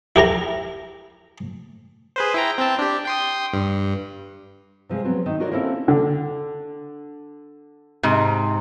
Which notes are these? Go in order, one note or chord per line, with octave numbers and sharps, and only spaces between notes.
E4 G4 A#4 A#5
G#4 B4 C5
E4 G5 A#5
C4 G5 A5
D4 G4
G5 C6 D#6
G2
C3 F3 G#3
F#3 B3 C4
D#3
F4 F#4 A#4 C#5 D5
A#3 C4 C#4 E4 A4
D3
G#2 C3